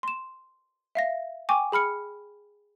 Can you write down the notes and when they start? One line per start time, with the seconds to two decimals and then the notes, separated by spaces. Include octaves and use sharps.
0.03 C6 E7
0.95 E5 F5 A#6
1.49 G5 G#5 C#6 D6
1.72 G#4 B5 F6 C#7